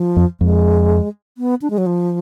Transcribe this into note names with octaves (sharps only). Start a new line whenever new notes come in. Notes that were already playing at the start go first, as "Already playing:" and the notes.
Already playing: F3
F2
F2 G#3
B3
D4
G#3
F#3
F3